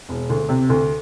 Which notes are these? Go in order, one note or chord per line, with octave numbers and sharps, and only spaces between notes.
E1
D2
C3
D2